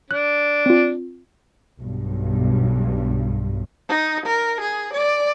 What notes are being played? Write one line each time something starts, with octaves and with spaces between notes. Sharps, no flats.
D4 F#6
C4 F4
B1 G2
D#4
A#4
G#4
D5